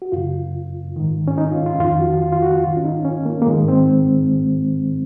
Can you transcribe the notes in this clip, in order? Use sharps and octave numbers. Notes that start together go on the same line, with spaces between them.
F#4
F#2 C#3 F4
G#2 D#3
C#4
D#4
F4
F4
F2 D#3 F4
F#4
F4
F4
F#4
F4
G#2 D#3 F4
C#4
D#4
C#4
A#3
A#3
G#2 D#3 G#3
C4